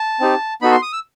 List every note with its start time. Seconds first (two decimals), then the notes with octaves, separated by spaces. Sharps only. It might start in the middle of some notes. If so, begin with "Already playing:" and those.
Already playing: A5
0.20 C4 D#4 G4
0.62 B3 D#4 F#4 A4 B5
0.71 C6
0.82 D#6
0.93 E6